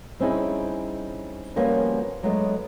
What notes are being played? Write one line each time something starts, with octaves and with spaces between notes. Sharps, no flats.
G3 C4 C#4 D#4 E4 G#4
F3 G3 A#3 B3 C#4 F#4
F#3 G#3 A3 B3 D4